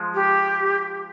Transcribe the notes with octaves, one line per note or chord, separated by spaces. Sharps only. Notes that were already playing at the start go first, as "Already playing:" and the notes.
Already playing: F3 G#3
G4